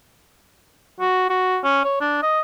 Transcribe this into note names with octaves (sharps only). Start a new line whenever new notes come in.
F#4
F#4
C#4
C#5
D4
D#5